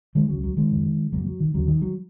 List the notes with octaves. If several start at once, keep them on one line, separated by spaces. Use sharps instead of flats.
D#3 G#3
C#2 C#3 F#3
F#3
D#3 G#3
F#2 C#3
F#2 C#3 F#3 A#3
F#3
D#3
D#2 C#3 F#3
D#3
F#3